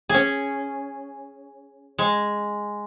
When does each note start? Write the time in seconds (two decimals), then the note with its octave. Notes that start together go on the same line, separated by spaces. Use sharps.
0.09 C#4 G#4
1.98 G#3